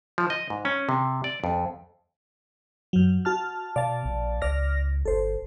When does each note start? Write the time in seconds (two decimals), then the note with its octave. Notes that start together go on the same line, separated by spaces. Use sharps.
0.18 F3
0.30 D#5
0.50 G#2
0.65 C#4
0.89 C3
1.24 D5
1.44 F2
2.93 F#2 F#3
3.25 F#4 A5 F6
3.76 B2 D5 F5 A5
4.05 A#1
4.42 C#2 D5 F6 A#6
5.05 G1 A4 C5